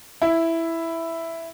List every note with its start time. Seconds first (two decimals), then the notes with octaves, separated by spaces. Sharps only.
0.22 E4